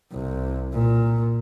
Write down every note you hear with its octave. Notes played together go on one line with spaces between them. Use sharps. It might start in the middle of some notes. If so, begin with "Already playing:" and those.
C2
A#2